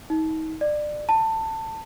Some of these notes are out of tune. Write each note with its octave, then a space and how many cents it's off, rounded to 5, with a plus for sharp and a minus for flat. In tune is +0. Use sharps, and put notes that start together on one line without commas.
D#4 +35
D5 +25
A5 +20